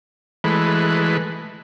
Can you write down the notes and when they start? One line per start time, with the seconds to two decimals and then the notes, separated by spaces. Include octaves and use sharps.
0.44 E3 G#3 A3 B4